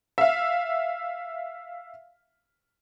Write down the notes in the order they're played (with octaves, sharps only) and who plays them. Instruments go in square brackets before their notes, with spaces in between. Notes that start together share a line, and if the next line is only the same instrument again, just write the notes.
[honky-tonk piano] E5 F5